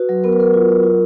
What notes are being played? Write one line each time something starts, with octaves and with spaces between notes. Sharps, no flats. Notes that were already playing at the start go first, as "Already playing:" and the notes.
Already playing: F#4 B4
F#3
B3 A#4
B4
F#3 A#4
F4
F#3
F4